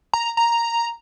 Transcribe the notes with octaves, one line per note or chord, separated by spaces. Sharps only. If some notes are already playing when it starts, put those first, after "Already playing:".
A#5
A#5